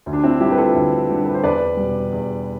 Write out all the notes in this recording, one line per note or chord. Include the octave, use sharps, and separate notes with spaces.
D2
D4
C4 E4
D3 G3 E4 G4
B4
F4 A4
D2
D3 G3
B4
C5
E2 B4 D5
B2 G3
E2